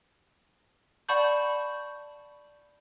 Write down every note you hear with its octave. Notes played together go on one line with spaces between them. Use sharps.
D5 F#5 A5 B5 C#6 G6